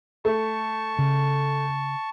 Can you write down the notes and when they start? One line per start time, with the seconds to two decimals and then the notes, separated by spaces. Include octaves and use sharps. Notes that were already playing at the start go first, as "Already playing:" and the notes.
0.25 A3 A5 C#6
0.99 C#3